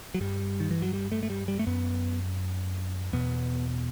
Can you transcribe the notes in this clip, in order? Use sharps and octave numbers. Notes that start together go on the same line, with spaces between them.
F#3
G2 G3
D#3
E3
F#3
G3
A3
A3
G3
G3
A3
F#2 B3
E2 B2 B3